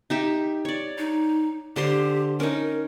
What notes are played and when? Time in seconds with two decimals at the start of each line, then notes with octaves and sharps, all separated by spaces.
0.10 D#4 G4 E5
0.65 C#5 D5
0.98 D#4
1.76 D3 G4 C5 C6
2.40 C#4 D#4 A#4